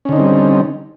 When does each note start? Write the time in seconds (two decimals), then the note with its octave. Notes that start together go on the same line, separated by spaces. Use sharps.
0.05 C#4
0.09 D3
0.12 D#4
0.16 C4
0.20 G3